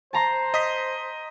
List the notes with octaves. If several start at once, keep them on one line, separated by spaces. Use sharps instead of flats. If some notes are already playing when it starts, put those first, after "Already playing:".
C5 A5 A#5 C6
D#5 D#6 B6